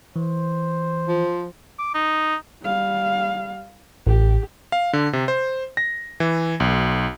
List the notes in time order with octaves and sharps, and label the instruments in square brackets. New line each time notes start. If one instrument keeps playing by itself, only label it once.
[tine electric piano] E3 [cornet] C5
[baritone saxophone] F3
[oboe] D6
D#4
[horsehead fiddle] G3 F5
[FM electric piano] A1 [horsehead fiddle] G4
[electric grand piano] F5
D3
C3
C5
A#6
E3
B1